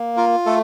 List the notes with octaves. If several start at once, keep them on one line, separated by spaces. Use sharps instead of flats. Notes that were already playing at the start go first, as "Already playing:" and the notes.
Already playing: A#3
F4 A#4
A3 A4